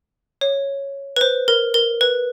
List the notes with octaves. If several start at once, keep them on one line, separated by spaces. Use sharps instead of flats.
C#5
B4
C5
A#4
A#4
B4